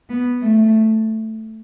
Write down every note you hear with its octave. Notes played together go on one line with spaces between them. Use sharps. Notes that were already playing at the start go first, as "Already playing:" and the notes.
B3
A3